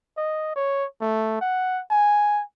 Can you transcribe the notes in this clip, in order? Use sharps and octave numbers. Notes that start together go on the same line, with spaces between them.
D#5
C#5
A3
F#5
G#5